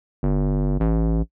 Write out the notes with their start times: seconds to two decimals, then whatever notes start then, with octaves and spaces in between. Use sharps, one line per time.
0.23 G1
0.80 A1